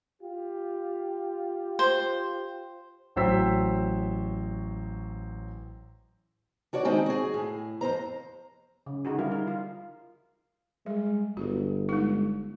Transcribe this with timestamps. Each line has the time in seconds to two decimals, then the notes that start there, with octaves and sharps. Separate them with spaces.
0.22 F4 G4
1.79 C5
3.16 A1 F#3 C5 G5 E6 B6
6.73 D4 F#4 C#5 D5
6.85 D#3 G#3 C4 D4 D#4
7.06 F#4 G#4
7.34 A2
7.81 F2 G#2 C5 A#5
8.86 C#3
9.05 D3 D#4 F#4 G#4
9.19 G3 E4 F4 A#4
9.32 D#4 A#4
9.48 F4
10.86 G3 G#3
11.37 G1 F#4
11.89 G#3 D#4